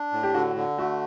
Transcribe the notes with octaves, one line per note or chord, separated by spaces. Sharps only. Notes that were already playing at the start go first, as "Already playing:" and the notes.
Already playing: D4
A2
G4
D3 F#4
D3
A3 F#4